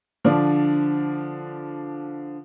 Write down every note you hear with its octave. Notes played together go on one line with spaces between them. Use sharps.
D3 F3 D4